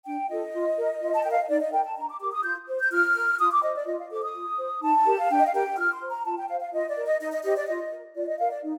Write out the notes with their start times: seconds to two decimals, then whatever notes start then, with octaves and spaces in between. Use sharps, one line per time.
0.06 D4 G5
0.29 F4 A4 D#5
0.53 F4
0.77 A#4
1.01 F4
1.14 A5
1.22 A#4 G5
1.31 F5
1.40 D#5
1.48 D#4 D5
1.60 D#5
1.72 A#4 G5
1.84 A5
1.96 D4 A#5
2.08 D6
2.20 G4 A#4 D6
2.31 D#6
2.43 F4 G6
2.68 C5
2.80 G6
2.91 F4 F6
3.15 A#4
3.38 F4 D#6
3.51 D6
3.63 C5 D#5
3.75 D5
3.86 F4 D#5
3.99 F5
4.10 A4 C5 D6
4.22 D#6
4.35 F4
4.58 C5
4.81 D#4 A5
5.06 G4 A#4
5.17 F5
5.30 D4 G5
5.39 D#5
5.46 F5
5.53 G4 A#4 G5
5.77 F4 F6
5.93 C6
6.01 C5
6.09 A#5
6.24 F4 A5
6.36 G5
6.48 C5 F5
6.60 F5
6.72 F4 D#5
6.88 D5
6.96 A#4
7.05 D#5
7.20 D#4 D#5
7.32 D#5
7.44 G4 C5 D#5
7.56 D5
7.67 F4 D#5
7.92 A#4
8.15 F4 D5
8.27 D#5
8.38 A#4 F5
8.50 D5
8.62 D#4